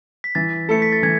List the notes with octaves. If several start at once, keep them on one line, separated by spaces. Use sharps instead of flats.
B6
E3 A6
A3 E4 A4 C#7
B6
A6
E3 G#6